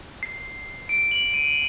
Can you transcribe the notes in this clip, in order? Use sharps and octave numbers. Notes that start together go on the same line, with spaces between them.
C7
D7
F#7
D#7